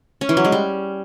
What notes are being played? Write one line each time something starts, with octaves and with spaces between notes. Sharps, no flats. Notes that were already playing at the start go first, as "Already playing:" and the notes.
C#4
E3
F#3
G#3
G3